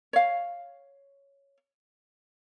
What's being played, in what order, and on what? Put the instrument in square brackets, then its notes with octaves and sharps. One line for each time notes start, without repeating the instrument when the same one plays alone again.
[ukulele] C#5 F5